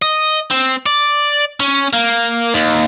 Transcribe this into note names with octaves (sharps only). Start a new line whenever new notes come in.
D#5
C4
D5
C#4
A#3
D#2